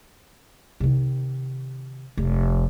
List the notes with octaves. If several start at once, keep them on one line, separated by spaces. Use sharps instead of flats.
C3 D#3
F1